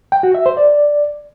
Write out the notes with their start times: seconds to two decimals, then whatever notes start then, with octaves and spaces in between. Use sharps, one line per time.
0.12 G5
0.23 F#4
0.35 E5
0.46 C5
0.57 D5